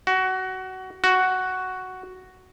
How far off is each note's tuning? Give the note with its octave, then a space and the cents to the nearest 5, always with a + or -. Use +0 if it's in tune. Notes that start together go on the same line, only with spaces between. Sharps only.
F#4 +20
F#4 +5